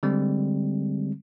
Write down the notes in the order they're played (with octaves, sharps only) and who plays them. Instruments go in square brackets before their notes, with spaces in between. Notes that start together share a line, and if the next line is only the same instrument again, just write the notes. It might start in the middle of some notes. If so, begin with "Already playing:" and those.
[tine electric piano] D3 G3 G#3 C4